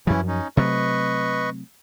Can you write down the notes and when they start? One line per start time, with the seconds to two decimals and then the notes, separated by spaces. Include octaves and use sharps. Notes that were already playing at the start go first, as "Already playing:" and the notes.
0.07 F#2 E3 F3 C#4 E4
0.28 C#4 D#4
0.57 C3 F#3 A3 B4 D#5 C#6